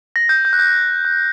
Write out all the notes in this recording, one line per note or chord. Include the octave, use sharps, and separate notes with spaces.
A#6
G6
G6
F#6
G6
F#6